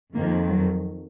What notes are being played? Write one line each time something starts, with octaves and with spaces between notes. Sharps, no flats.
F2 D#3 A#3
F#3